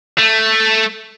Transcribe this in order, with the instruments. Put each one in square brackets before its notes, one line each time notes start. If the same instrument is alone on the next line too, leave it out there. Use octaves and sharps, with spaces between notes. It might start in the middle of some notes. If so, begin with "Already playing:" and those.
[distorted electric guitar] A3